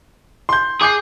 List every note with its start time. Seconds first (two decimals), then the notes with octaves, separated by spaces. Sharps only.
0.49 C6 G6
0.82 G#4 D6 G6 C7